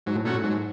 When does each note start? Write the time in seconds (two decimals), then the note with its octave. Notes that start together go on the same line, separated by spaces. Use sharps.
0.06 G#2 F#3
0.16 A2
0.25 A#2 A3 C#4 F#4
0.34 A2
0.44 G#2 F#3